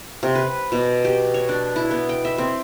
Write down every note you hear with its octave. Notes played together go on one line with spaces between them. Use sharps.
C3
B4
B2
G4
C#5
D4
E4
B3
G5
E5
C4